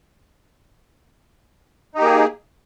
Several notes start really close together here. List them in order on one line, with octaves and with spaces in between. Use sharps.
D#4 G4 A#3 G#4